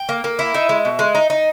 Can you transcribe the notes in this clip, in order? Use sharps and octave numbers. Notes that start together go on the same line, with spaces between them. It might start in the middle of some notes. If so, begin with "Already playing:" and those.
Already playing: G5
A#3
A#3
E4
D#4 E5
G#3
B2
G#3
D#4
D#4